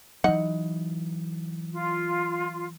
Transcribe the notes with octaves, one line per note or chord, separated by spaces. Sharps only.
E3 F#3 D#4 F#5
F4